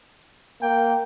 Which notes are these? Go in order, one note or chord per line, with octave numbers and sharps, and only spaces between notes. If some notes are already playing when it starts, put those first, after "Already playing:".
A#3 G5